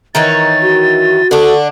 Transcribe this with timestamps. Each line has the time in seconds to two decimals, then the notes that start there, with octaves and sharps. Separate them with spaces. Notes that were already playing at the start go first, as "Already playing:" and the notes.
0.15 D#3 E3 C#5 A6
0.62 F#4
1.31 D3 D4 A4 C#6